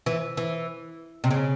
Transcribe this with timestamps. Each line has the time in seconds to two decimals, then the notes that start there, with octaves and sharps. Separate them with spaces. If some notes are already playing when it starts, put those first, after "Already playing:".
0.06 E3
0.37 E3
1.24 C3
1.31 C#3